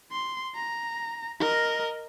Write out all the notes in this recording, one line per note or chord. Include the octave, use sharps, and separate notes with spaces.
C6
A#5
A#4 D#5